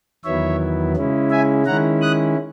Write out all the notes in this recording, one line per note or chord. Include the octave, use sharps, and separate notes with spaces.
E2 D#3 F#3 B3 E4 C#5 E5
C#3 G#3 C#4 E4
E5 G#5
D#3 G#3 C#4 E4 F#5 A#5
D#6 F#6